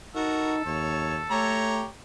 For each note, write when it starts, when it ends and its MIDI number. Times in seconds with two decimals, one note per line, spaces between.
0.15 0.64 63
0.15 0.55 66
0.15 1.72 69
0.15 0.55 70
0.66 1.22 39
0.66 1.18 73
1.31 1.85 57
1.31 1.86 67
1.31 1.86 73
1.31 1.86 82